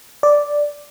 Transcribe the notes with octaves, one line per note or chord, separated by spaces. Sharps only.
D5